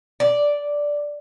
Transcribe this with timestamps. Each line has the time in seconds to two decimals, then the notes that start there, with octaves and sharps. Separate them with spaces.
0.20 D5